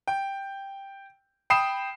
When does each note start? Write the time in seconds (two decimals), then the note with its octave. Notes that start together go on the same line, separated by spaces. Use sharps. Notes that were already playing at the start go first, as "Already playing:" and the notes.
0.08 G5
1.50 G5 B5 D#6 C7 E7